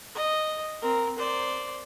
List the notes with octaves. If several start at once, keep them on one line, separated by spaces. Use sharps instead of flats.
D#5
C4 A#4
C5 D5